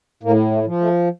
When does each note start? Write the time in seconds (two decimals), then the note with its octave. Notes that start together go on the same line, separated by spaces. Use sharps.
0.23 A2 A#3
0.51 A3
0.66 F3
0.80 A3